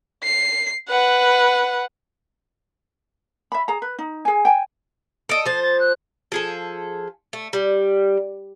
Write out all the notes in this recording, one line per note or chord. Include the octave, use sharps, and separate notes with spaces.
C7
B4 F#5
E5 B5
G#4 A#5
B4
D#4
G#4 G#5
G5 G#5
A4 D#5 D7
F3 C5 A6
A6
F#6
F3 G#4 A4
A3
G3